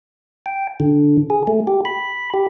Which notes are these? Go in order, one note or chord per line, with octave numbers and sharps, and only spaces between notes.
G5
D3
G#4
A3
G4
B5
G4